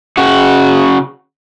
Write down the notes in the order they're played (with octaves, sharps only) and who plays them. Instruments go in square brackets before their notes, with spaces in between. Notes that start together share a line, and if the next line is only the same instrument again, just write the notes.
[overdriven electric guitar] C#3 F#4